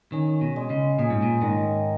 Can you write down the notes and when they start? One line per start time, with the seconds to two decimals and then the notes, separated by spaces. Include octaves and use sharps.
0.12 D#3 C#4
0.41 B2
0.56 G#3
0.70 C#3
0.99 A#2 G#4
1.10 G#2
1.22 A#2
1.42 G#2 D#3